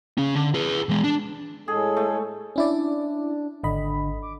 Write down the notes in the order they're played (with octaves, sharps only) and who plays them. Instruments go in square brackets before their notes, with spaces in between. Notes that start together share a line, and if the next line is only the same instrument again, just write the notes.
[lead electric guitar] C#3 C#4
D3
G#4 B4
E3 G#3
D4
[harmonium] A2 G#3 A4 [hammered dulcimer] G#4
[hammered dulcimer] A3
[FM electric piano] C#4 E4 D5 [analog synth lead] D4
[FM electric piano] G#1 D#5 B5 [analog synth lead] D3
[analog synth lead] D6